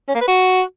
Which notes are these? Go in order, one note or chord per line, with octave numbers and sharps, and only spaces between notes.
C#4
A#3
B4
F#4